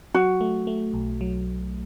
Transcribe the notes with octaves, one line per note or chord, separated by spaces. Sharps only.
F#3 F#4
A3
A3
B1
F#3